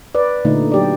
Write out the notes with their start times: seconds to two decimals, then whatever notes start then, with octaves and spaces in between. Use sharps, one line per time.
0.15 B4 D5
0.45 A#2 D3 A3 D#4
0.72 F#3 G4 D5